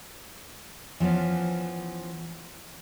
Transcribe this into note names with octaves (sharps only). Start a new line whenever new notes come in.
E3 F3 B3 C#4